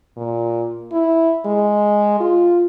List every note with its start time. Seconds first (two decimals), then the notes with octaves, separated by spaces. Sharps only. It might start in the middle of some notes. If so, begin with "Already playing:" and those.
0.17 A#2
0.92 E4
1.45 G#3
2.20 F4